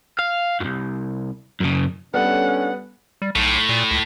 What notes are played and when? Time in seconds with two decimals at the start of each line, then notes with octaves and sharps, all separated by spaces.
0.19 F5
0.60 C2 F#2
1.60 F#2 C#3
2.14 G3 B3 C#4 D4 A4 F#5
3.22 G3
3.36 B1 A2
3.69 A#2
3.91 C#2